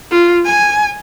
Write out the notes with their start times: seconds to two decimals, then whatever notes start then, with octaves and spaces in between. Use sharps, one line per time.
0.11 F4
0.45 G#5